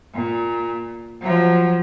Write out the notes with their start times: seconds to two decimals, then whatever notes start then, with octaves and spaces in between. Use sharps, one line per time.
0.14 A#2
1.22 F3 F#3